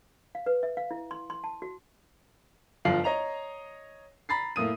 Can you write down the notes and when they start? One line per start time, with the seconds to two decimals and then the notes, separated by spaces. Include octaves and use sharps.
0.35 F5
0.46 B4
0.63 E5
0.77 F5
0.91 E4
1.11 C6
1.30 C6
1.44 A5
1.62 F#4
2.85 G1 F3 F4 F5 C7 F#7
3.04 C#5 D#5 A#5 F7
4.29 A#5 B5 A6 C7
4.56 A2 A#3 D#6 D#7